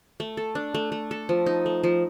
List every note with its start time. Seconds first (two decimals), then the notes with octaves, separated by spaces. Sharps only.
0.20 A3
0.37 A4
0.55 D4
0.74 A3
0.92 A3
1.11 A4
1.29 F3
1.46 D#4
1.66 A3
1.83 F3